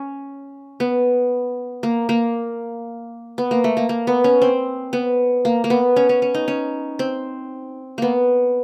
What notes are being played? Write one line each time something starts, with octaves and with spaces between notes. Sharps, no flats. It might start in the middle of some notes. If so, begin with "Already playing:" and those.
Already playing: C#4
B3
A#3
A#3
B3
A#3
A3
A#3
A#3
B3
C#4
C4
B3
A#3
A#3
B3
C#4
C#4
C#4
D#4
C#4
C4
A#3 B3